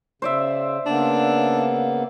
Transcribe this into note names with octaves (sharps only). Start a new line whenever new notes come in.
C#3 C5 D5 E5
C#3 A#3 B3 D4